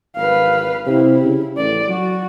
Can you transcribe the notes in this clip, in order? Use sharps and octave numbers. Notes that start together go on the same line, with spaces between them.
G#1 B4 F5
C3 E4
C#3
A1 D5
F#3 F#4